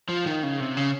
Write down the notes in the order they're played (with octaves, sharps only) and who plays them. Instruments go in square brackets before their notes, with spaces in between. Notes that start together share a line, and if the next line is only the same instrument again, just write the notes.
[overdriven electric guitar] F3
D#3
C#3
C3
C#3